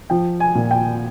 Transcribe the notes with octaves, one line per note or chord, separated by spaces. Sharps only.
F3 G5
G#5
A#2
G5